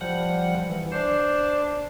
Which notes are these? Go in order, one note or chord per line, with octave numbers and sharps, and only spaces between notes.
F3 G3 F#5
E3
D4 C5